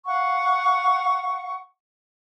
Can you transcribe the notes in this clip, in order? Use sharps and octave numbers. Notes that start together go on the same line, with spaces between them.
F5 F#5 C#6